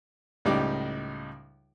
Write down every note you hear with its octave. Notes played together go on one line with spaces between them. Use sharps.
C#2 A2 G3 D#4 D6